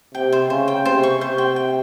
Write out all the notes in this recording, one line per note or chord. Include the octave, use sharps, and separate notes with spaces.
C3 G5
C5
C#3 C5
G5
C3 C5
C#6
C3 C5
G5
G5